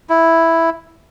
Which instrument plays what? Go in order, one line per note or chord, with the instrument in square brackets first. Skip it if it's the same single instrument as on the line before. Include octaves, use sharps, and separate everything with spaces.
[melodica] E4